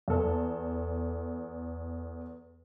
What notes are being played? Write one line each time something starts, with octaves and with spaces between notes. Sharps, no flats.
E2 A4